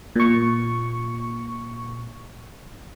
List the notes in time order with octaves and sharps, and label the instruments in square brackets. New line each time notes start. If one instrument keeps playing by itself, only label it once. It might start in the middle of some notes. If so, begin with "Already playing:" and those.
[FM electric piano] A#2 C#6